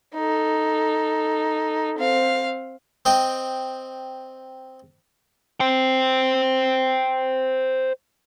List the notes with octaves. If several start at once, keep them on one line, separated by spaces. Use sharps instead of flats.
D#4 A4
C4 F5
C4 D#5 G5
C5 G5